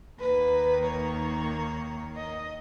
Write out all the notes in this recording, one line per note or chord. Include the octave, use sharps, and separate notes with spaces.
D#2 D#3 A#3 B4
C#5
D#5